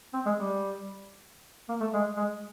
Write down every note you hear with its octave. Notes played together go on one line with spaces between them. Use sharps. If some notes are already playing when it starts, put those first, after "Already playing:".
C4
G#3
G3
A#3
A3
G#3
G#3